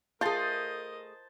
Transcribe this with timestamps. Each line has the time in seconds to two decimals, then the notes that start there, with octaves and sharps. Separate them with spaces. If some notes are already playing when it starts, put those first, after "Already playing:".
0.21 A3 F4 G#4 A#4 C5 D#5 A5